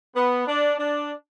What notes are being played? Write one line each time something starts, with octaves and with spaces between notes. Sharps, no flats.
B3
D4
D4